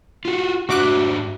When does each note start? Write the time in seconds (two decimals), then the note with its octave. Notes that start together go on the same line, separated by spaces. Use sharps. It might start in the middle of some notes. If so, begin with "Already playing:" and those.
0.25 F4 F#4
0.69 G#2 D4 F#4 E5 D6 F#6